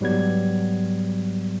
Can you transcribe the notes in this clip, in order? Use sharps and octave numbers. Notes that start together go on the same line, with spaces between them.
G#2 F#3 G3 B3 G#6